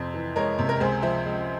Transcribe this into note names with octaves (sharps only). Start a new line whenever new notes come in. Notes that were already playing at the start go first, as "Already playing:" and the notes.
Already playing: F2 C3 C5
E3
G#3 A#4 C#5
C3
A#4
C#2 G#4 C5
F3 C5 E5
G#3